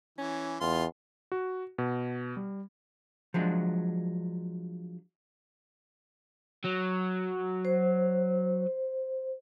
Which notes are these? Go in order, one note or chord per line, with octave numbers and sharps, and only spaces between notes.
E3 C#4
E2 F4 C6
F#4
B2
G3
F3 F#3 G#3 D4
F#3
C5